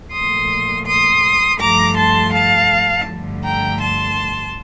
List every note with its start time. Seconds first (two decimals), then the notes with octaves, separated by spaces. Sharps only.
0.12 A#2 F3 A3 C6 D#6
0.86 C6 D#6
1.60 G2 F3 A3 A#5 D6
1.96 A5 C6
2.33 F5 A5
3.07 G2 D3 F3 A3
3.43 G5 A#5
3.80 A5 C6